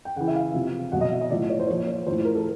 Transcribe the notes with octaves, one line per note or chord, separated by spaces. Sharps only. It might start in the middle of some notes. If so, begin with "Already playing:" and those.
G5
C#3 E3 F#5
E5
F5
C3 F3
B2 F#3 F#5
D#5
E5
D#5
A2 F3 D5
C#5
C5
A#2 F3 C#5
C#5
A2 F3 C5
A#4
A4